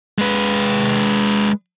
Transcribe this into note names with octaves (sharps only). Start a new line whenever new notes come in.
G#3 B4